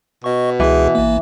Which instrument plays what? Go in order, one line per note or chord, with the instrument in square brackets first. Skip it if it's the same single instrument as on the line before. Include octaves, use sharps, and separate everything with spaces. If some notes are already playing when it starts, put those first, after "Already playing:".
[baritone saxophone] B2 [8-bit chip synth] D#5 C#6
[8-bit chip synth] C#2 G#4 [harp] E3
[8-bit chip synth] A1 A#3